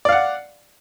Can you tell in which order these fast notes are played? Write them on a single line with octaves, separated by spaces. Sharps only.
D5 F5 F#5